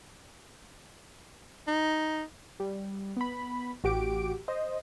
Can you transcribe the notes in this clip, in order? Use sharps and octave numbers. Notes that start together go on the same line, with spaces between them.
D#4
G3
B3 B5
A1 F#4 G4 D6 D7
C5 D#5